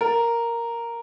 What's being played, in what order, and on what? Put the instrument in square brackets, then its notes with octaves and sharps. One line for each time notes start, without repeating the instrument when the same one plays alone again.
[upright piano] A#4